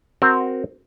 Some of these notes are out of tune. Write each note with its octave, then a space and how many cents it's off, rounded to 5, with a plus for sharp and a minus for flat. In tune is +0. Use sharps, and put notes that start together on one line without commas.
C4 +0 F#4 +0 A#4 +0